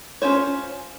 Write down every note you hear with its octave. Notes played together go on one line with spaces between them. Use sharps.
C#4 F4 C5 C#5